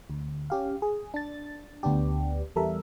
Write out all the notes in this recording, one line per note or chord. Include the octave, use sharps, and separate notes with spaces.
D2
C#4 G4 F5
G#4
D4 A6
D2 B3 D4 G4
E2 G3 A4 A#4 E5